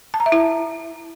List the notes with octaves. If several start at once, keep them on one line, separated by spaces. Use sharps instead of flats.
A5
A#5
E5
E4